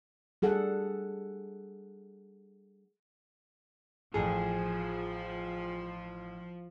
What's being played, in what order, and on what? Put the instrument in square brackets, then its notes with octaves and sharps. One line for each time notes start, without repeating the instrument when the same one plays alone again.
[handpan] G3 G#4 A4 F#5
[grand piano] A1 A4 [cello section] F3 [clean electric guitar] G#4